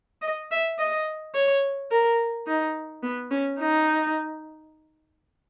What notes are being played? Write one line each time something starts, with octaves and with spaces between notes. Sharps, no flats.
D#5
E5
D#5
C#5
A#4
D#4
B3
C#4
D#4